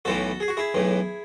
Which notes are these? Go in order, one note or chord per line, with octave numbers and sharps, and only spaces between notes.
B1 A2 E3 F#4 A4
G#4
F#4
E4 G#4
B1 A2 E3